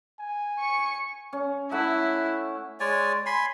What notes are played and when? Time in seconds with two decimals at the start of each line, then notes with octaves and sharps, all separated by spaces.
0.19 G#5
0.59 C#6 C#7
1.33 C#4
1.71 A3 E4 F#5
2.80 G#3 C#5 D5 G#5
3.26 G#5 B5 C6